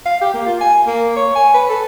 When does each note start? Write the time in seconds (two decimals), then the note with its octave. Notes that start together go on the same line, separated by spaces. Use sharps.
0.06 F5
0.21 G4
0.34 A#3
0.46 F4
0.61 G#5
0.87 A#3
1.16 C#5
1.36 G#5
1.54 B4
1.69 A4